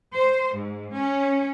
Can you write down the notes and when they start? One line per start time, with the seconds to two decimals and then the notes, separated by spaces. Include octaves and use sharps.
0.15 C5
0.56 G#2
0.96 C#4